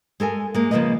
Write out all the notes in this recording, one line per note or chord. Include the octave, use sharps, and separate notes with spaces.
G#3 A4 A#4 G#5
G#3 A#3
C#3 F3 F#3 A#3 B4 D#5